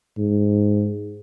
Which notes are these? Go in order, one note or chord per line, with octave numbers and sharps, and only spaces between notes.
G#2